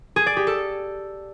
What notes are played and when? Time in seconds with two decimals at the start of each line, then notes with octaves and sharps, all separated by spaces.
0.16 G#4
0.26 D5
0.37 G4
0.47 A4